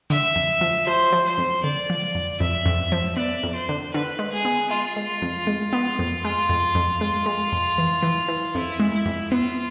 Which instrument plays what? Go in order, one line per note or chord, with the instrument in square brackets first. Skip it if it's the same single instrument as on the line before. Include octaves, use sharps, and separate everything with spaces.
[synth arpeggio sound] D3 [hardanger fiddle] E5
[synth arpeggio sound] F2
F3
[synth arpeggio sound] F3 [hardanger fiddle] C5
[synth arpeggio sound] F3
[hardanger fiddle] C5
[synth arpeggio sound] F2
[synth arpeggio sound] D3 [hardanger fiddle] D5
[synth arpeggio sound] F3
F2
[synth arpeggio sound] F2 [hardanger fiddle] E5
[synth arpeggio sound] F2
F3
[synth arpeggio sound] B3 [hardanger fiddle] D5
[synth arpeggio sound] F2
[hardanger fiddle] C5
[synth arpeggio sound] D3
[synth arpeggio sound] D3 [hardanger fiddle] B4
[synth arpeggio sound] G#3
[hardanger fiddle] G#4
[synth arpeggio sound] B3
[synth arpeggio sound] G#3 [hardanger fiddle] F4
[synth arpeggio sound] G#3
F2
G#3
B3
F2
[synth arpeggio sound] G#3 [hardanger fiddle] F4
[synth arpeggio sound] F2
F2
[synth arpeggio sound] G#3 [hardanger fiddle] F4
[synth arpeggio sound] G#3
F2
E3
E3
E3
[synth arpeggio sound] F2 [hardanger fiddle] E4
[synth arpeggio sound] G#3
[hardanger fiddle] E4
[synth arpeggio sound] F2
[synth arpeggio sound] B3 [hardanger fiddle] F4